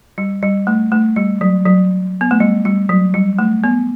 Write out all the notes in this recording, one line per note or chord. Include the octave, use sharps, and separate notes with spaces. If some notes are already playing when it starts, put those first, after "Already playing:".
G3
G3
A3
A3
G3
F#3
F#3
B3
A3
G3
G3
F#3
G3
A3
B3